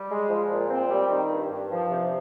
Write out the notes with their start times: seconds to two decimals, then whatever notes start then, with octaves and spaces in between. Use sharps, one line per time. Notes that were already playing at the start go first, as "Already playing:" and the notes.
Already playing: G3
0.10 G#3
0.30 F3
0.51 A#2
0.70 C4
0.90 G3
1.10 D#3
1.30 G2
1.50 G2
1.71 F3
1.91 C3